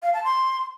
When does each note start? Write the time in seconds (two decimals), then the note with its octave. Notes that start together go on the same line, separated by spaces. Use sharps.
0.03 F5
0.14 A5
0.24 C6